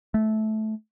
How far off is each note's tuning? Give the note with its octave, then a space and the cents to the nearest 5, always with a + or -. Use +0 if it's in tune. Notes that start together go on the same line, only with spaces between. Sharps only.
A3 -15